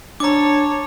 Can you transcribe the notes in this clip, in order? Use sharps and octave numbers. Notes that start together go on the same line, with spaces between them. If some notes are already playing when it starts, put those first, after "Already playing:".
D4 C#5 A5 A#5 D6